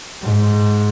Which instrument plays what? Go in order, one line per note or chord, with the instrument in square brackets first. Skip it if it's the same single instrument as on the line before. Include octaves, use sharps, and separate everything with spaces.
[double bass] G#2